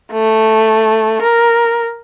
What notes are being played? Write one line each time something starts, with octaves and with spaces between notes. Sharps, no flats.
A3
A#4